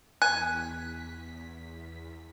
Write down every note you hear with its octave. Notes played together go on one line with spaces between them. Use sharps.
E2 G#5 F#6 B6